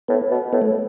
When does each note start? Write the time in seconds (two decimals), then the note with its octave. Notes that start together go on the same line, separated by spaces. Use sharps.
0.08 A2 B3
0.31 B2
0.53 A2 B3
0.62 A3